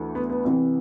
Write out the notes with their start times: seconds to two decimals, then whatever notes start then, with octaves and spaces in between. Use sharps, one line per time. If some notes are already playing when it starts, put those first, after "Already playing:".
Already playing: D2 E3
0.15 B3
0.30 B3
0.45 C2 C3 E3